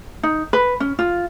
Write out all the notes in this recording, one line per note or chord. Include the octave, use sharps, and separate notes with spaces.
D#4
B4
C#4
F4